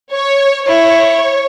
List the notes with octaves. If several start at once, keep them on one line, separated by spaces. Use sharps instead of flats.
C#5
E4 C#5